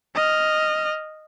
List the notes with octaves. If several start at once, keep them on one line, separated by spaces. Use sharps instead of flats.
D#5 F6